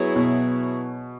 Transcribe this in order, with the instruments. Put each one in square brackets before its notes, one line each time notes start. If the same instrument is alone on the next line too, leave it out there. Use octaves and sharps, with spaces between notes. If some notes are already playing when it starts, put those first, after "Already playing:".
Already playing: [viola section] F#3 B3 E4 G#4 C#5
[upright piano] B2